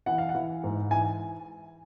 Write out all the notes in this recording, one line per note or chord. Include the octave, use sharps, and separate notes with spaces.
E3 F#5
F5
F#5
E3
G#2
E3 G#5